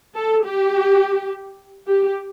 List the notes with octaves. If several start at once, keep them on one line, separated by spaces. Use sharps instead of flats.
A4
G4
G4